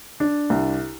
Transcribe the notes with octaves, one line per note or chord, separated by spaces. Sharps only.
D4
C2